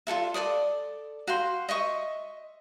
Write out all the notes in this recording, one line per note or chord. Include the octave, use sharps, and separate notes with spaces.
F4 G#4 A4 E5
A4 C5 D5 D#6
F#4 F5 G5 C6
D#5 E5 C#6 D#6